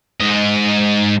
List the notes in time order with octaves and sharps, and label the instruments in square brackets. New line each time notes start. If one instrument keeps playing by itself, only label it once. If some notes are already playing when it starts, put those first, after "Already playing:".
[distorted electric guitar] G#2 D#5